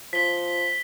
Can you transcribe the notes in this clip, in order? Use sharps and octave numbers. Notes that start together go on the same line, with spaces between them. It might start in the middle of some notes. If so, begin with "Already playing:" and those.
F3 B6 G7